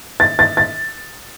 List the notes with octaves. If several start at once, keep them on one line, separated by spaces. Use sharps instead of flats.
A6
A6
A6